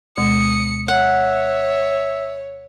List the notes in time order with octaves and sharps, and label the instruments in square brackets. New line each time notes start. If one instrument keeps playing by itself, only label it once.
[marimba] D2 B2 G#3 [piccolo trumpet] D#6 [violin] C#7
[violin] C#5 [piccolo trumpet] E5 [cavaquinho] F#5